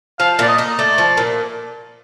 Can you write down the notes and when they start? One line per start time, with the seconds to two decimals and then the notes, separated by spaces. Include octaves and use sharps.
0.19 F3 F5
0.39 A#2 D5
0.48 D#5
0.58 D#4
0.79 A3 D5
0.98 F3
1.17 A#2